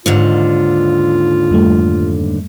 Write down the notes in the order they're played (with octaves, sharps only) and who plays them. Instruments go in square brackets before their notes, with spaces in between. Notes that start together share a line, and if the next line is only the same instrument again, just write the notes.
[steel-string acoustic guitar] D#2 G#2 D3 [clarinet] F4
[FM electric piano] F2 G3 A3